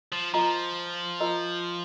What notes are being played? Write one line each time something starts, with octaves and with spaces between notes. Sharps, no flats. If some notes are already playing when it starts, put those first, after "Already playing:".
F3
F3 F4 A#4 D#5 A#5
F4 A#4 D#5 A#5